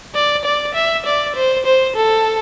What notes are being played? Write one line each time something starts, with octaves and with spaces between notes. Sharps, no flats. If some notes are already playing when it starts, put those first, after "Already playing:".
D5
D5
E5
D5
C5
C5
A4